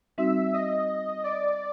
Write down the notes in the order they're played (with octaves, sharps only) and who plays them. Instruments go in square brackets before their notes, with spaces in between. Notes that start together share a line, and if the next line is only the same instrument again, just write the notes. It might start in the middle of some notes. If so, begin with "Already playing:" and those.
[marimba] G3 C4 D#4 F#4 [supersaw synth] E5
[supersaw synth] D#5
D5